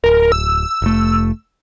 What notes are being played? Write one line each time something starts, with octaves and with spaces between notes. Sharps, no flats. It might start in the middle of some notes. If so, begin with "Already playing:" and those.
D1 A#4
E6
F1 A3